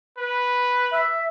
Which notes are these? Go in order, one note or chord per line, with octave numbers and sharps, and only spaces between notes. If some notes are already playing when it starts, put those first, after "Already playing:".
B4
E5